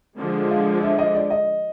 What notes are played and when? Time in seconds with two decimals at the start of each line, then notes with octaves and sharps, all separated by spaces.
0.18 D3 F3 G#3
0.51 F5
0.83 E5
0.99 D#5
1.15 D5
1.30 D#5